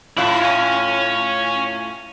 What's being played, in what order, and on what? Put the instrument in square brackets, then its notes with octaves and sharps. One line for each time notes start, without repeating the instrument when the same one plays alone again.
[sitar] A2 F4 [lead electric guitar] E4
[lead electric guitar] C#5 G#5